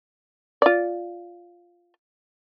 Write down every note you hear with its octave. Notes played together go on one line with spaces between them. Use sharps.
F4 D5